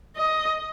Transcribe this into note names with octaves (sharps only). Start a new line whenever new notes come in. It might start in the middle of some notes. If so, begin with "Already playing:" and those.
D#5